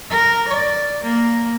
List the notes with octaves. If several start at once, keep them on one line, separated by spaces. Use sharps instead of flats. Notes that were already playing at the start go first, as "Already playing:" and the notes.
A#4
D5
A#3